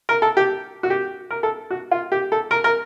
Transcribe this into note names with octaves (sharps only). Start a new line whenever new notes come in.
A#4
A4
G4
F#4
G4
A#4
A4
F#4
F4
G4
A4
A#4
A#4